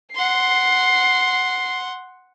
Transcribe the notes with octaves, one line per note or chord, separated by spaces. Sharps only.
F#5 C6 C7